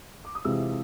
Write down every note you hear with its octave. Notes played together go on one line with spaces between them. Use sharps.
D6
D#6
C3 E3 G#3 C4 F4 E6